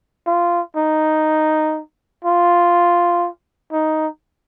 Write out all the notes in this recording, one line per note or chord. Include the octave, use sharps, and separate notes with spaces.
F4
D#4
F4
D#4